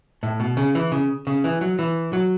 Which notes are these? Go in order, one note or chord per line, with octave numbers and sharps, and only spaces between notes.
A2
B2
C#3
E3
C#3
C#3
E3
F#3
E3
F#3